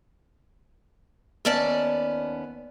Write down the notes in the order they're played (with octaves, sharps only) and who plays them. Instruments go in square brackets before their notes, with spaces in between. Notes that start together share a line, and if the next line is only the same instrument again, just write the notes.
[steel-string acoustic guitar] D#2 B3 C#4 D5 A5